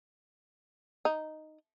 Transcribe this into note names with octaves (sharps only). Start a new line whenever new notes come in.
D#4